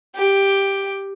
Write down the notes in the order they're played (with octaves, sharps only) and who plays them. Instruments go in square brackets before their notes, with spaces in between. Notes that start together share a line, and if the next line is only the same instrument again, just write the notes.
[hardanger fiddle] G4